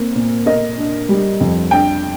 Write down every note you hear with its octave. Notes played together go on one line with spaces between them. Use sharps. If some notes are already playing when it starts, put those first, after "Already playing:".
Already playing: A#3 C4
A#2
A#3 D#5
D4
G3
F2
D4 G5